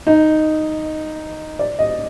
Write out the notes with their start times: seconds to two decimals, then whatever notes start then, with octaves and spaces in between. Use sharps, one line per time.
0.07 D#4
1.59 D5
1.79 D#5